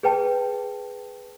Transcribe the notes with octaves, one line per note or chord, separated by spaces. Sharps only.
G#4 B4 G5 A5